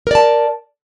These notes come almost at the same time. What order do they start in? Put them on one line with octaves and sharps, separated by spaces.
A#4 D5 A5